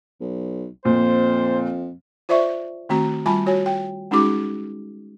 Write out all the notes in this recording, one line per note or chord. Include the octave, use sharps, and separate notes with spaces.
B1
F2 A#2 C5
F4 C5 D5 E5 C#6
D#3 A3 C4 F#4 A#5
G3 F4 G#5 A5 B5
F#4 C#5 G#5
G5
G#3 C#4 D#4 F#4 G#4 D6